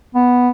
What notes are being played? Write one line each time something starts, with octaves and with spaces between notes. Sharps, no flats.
B3